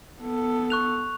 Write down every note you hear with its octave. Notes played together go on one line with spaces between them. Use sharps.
B3 A4
C#6 F#6 F7